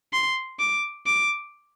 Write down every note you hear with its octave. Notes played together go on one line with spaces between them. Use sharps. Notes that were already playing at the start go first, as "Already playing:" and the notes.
C6
D6
D6